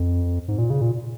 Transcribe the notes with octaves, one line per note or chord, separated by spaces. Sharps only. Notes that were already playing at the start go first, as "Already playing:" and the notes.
Already playing: F2
G#2
A#2
C#3
A#2